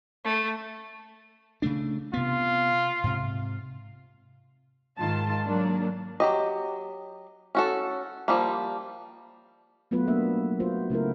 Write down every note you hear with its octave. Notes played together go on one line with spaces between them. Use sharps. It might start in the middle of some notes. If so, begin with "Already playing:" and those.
A3
C#3 A3 D4
C3 B3 F4
G#2 C3
G#2 D#3 F4 A5 C6
F#3 A#3 D4
F#3 G4 D#5
C#4 F#4 A4
F3 G3 A#3
F#3 A3 B3 F4 B4
A#3 D4 E5
F4 F#4 C5
C#3 A3 E4 A#4